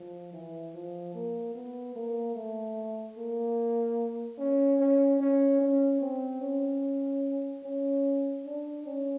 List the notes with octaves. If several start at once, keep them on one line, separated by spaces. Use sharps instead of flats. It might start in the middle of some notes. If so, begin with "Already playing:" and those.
Already playing: F3
E3
F3
A#3
B3
A#3
A3
A#3
C#4
C#4
C#4
C#4
C4
C#4
C#4
D4
C#4